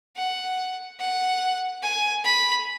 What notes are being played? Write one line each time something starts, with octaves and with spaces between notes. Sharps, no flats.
F#5
F#5
G#5
B5